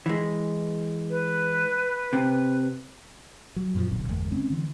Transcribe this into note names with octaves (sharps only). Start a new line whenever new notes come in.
E3 G#3
B4
C3
F#3
F#2 A#2 C#3 F3
D#1 B1 B2 D3
G1 E2 G#3 A#3
C#3 G#3 C4 C#4
D3 E3